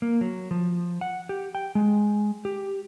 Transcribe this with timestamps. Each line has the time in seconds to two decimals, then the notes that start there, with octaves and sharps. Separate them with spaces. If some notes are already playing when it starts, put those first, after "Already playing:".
0.02 A#3
0.21 F#3
0.51 F3
1.01 F#5
1.29 G4
1.55 G5
1.75 G#3
2.45 G4